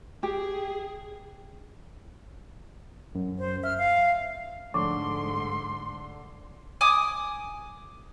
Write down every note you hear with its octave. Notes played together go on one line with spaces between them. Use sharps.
G4 G#4
F#2
C5
E5 F6
F5
G#2 D3 F3 A3 C6 D6
G#5 D6 D#6